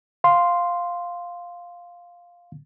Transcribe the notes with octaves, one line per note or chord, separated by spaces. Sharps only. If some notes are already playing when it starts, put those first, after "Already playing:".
F5 C6